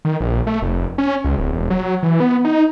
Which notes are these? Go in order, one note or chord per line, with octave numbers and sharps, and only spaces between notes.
D#3
A#1
A3
F1
C#4
C#2
D1
E1
F#3
E3
B3
D#4